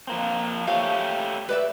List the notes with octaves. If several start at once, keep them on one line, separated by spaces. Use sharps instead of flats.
F3 A#3 C4
A3 G4 C#5 F5
B4 D5 E5